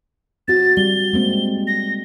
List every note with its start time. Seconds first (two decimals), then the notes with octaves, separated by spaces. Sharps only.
0.48 C4 F#4 A6
0.77 G3 G7
1.13 G#3 A#3 C4
1.67 A#6